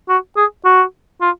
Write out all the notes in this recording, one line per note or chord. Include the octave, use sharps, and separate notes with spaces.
F#4
G#4
F#4
F4